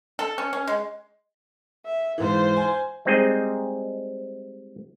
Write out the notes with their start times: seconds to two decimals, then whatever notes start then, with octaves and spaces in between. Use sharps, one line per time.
0.19 A4
0.38 C#4
0.53 C#4
0.67 G#3
1.86 E5
2.18 G#2 E3 F4 C5
2.56 G#5
3.05 G3 G#3 C4 D#4 G#4 D#5